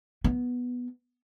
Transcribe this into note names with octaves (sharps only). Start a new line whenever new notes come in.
B3